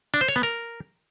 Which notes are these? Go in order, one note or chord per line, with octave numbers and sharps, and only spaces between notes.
D4
C5
C#5
B3
A#4